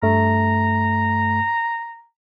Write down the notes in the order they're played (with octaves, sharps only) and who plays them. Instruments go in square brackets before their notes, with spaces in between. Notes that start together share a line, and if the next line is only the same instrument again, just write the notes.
[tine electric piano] G2 A3 [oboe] A#5